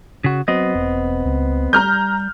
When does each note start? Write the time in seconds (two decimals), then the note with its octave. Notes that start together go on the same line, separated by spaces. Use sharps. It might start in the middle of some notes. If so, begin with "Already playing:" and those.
0.24 C#3 F#4
0.48 F#3 B3 C4 D#5
0.75 E1
1.25 C#2
1.73 G3 A#5 F6 G6